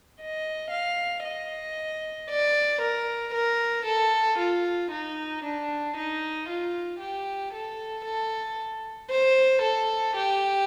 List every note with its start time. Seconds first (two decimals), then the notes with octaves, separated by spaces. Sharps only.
0.20 D#5
0.71 F5
1.24 D#5
2.28 D5
2.80 A#4
3.33 A#4
3.85 A4
4.38 F4
4.90 D#4
5.43 D4
5.95 D#4
6.48 F4
7.00 G4
7.52 A4
8.04 A4
9.09 C5
9.61 A4
10.14 G4